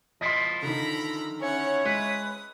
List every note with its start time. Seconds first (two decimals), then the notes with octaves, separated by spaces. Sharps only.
0.21 F3 E4 F4 D#5 C6
0.63 D3 D#3 A#5 B5
1.41 C#4 E4 C#5 F#5
1.85 G#3 B4 D#6